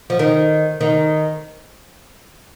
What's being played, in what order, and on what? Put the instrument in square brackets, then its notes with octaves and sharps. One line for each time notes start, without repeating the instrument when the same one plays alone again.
[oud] F3
D#3
D#3